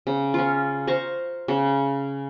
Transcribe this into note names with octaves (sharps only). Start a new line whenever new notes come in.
C#3
C#4 F4
C5 F5 A#5 C#6
C#3